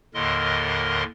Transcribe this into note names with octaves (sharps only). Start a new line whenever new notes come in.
D#2 A2 D3 A#4 D#5 C6